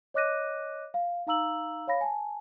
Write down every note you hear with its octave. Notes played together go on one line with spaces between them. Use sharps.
C#5 D#5 D6 F#6 A#6 D#7
F5
D#4 F5 A#5 E6 F#7
C#5 F5 B5 A#6
G#5 A5